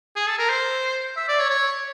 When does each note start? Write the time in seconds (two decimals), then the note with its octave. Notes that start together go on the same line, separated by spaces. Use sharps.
0.16 G#4
0.27 A4
0.39 A#4
0.49 C5
1.17 E5
1.28 D5
1.40 C#5
1.50 C#5